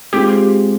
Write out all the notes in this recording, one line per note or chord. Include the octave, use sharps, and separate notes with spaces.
G#3 C4 F4 G4 G#4